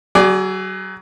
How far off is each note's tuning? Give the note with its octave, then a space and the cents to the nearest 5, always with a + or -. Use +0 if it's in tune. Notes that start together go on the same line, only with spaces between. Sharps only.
F#3 +35 G#4 +0 D5 +0